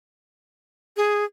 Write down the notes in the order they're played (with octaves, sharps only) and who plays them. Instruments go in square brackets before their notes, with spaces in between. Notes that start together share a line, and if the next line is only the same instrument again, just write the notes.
[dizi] G#4